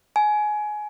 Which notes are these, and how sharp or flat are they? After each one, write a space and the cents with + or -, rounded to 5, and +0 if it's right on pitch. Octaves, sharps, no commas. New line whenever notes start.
G#5 +20